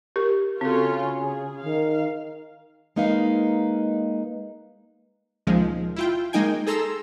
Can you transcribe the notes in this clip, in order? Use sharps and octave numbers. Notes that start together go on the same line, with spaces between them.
G4 A#4
C#3 C4 F4 F#4 A4 C#5
G#4
D#3 F5
G#3 A#3 D#4 B4 F5
C#2 A#2 D#3 F3 G#3
E4 F4 G5
G#3 A#3 D#4 G5 G#5
G#4 A4 A#5 C6 E6